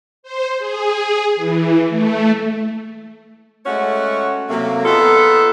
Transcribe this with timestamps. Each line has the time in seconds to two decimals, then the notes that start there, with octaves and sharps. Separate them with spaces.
0.23 C5
0.59 G#4
1.36 E3
1.89 A3
3.66 G#3 A3 C#4 F#4 C#5 F#5
4.50 C3 F#3 A3 A#3
4.85 B3 D#4 F4 G#4 A4